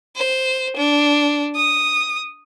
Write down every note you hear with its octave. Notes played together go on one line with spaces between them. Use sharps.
C5
D4
D#6